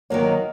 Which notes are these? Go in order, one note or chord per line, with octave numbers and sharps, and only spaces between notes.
D#3 F#3 A#3 C#5
D#5